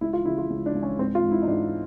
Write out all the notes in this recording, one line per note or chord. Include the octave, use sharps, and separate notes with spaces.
C#2 E4
F4
C#3 E4
F4
C#2
D4
C#2
C#4
G#2 C4
F4
G#2
E4
D#4
G#2 D4